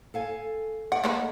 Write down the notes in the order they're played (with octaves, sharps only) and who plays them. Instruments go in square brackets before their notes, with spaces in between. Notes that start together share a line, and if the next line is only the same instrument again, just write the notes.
[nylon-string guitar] A4 F5 G#5
[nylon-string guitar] D5 [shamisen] F#5
[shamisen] D#3 A#3 B4 [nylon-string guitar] A3